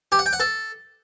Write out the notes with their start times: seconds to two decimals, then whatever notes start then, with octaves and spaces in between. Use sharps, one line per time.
0.12 G4
0.19 F#5
0.26 G5
0.33 F#5
0.40 A4